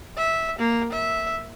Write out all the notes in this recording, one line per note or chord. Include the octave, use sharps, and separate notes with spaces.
E5
A#3
E5